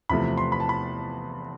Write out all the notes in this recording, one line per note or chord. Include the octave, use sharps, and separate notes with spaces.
E2 C3 F3 A3 B5
C6
B5
A5
B5